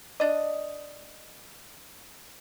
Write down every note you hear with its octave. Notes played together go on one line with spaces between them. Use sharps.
D4 D#5